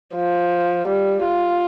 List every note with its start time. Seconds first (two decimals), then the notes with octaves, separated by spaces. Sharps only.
0.15 F3
0.87 G3
1.24 F4